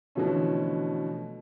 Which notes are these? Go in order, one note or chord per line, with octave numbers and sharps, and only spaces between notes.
B2 D3 E3 F3 A3 C#4